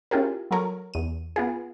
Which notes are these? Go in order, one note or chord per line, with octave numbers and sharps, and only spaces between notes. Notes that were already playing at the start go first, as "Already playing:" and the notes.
C#4 E4 F4 G4 G#4 A#4
F#3 A4 A#4 C#5
E2 D#7
B3 F4 G#4